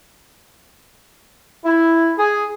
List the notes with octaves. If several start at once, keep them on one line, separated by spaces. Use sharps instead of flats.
E4
G#4